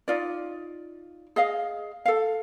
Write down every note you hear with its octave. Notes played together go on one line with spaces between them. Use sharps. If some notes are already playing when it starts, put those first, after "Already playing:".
D#4 F4 D5
G#4 D#5 F5
A4 F5